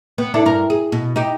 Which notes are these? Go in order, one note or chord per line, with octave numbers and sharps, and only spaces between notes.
B3
D4 E4 A4
G2 A#4
G#4
B2
D#4 G4